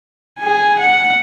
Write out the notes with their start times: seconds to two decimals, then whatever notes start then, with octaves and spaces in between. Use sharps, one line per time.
0.39 G#4 G#5
0.79 F#5